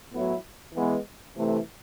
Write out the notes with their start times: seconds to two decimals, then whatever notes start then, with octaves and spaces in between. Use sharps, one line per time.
0.13 A2 F#3 B3 E4
0.75 E3 G#3 B3
1.37 C3 E3 A3